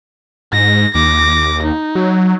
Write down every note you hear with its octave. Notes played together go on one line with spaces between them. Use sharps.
G#2 A#6
D#2 D6 A#6
D#4
F#3